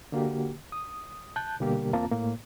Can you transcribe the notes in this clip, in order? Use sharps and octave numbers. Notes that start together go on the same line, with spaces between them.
D3 A#3 F#4 G4
D#6
A5 F#6 G6
B2 D3 G3 A#3 G4 A#4
E2 A#3 C4 F4 A5 A#5
A2 A#3